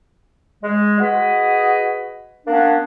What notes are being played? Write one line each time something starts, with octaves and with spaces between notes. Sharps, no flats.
G#3
F#4 G#4 B4 D#5
A#3 B3 C#4 D4